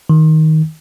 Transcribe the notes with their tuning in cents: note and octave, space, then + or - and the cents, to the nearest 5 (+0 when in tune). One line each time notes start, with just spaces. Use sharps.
D#3 +15